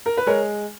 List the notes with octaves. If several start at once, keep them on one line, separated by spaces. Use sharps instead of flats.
A#4
B4
G#3 A#4 C#5